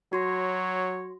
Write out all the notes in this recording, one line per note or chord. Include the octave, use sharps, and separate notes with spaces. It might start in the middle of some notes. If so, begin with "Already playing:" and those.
F#3 F#4 C#5 C6 A#6